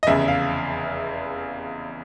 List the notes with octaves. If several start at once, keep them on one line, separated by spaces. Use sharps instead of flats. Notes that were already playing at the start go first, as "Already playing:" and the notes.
D#5
F1 E2 C#3 E5
F5